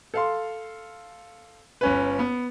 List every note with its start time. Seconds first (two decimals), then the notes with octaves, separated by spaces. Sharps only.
0.14 A4 F5 C6
1.81 G1 C#4 B4
2.19 B3